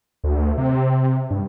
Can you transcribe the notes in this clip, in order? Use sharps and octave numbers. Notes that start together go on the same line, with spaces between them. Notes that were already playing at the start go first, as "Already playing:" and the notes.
D2
C3
G2